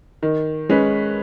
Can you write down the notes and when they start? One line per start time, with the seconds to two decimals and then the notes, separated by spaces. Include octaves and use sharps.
0.23 D#3
0.69 G#3 C#4 B4